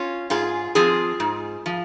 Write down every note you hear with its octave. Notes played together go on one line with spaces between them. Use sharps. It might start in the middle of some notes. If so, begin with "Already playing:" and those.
Already playing: C#4 F4
G#2 F4 G#4
F3 C4 F4 G#4
G#2
F3